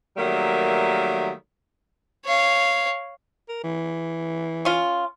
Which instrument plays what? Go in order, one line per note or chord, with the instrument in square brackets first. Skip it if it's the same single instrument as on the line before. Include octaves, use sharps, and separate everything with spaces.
[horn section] D#3 F#3 G3 A3 A#3 E5
[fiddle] C#5 F5
[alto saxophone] A#4
E3
[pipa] C#4 F4